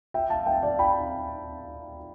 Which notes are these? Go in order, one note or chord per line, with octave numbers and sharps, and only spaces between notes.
E5 G5
F5 A5
E5 G5
D5 F5
G5 B5